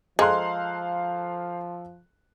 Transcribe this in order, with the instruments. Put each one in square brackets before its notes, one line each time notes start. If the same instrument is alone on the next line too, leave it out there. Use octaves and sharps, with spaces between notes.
[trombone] F3 [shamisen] G#3 [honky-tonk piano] A4 A#5 C6 [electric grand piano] C5 F5 F#6